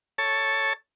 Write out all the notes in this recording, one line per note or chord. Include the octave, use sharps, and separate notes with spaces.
A4 C#5 A5